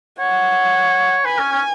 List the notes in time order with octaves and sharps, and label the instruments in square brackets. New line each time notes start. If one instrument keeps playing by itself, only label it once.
[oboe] C#5 [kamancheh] F#5
[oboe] B4 [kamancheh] G#5
[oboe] C#4
C#4